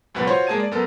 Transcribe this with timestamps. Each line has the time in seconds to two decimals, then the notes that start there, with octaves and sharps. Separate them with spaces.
0.15 C#2 F#2 B2 B4 F#5 B5
0.27 F4 F#4 C5 C#5 C6 C#6
0.47 G#3 A#3 G#4 A5 G#6 D#7
0.60 D5
0.71 F#2 B3 A4 A#4